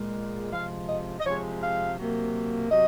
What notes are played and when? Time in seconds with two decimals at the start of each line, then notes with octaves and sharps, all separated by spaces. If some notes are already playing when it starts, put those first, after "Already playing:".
Already playing: A#2 G#3
0.52 C3 F3 G#3 F5
0.88 D#5
1.20 D#5
1.25 C3 F3 G#3 C#5
1.61 F5
1.98 C3 F#3 A#3
2.70 C3 F#3 D#5